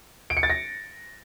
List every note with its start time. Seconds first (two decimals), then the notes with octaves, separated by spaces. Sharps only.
0.30 D7
0.37 C#7
0.43 A6
0.50 A#6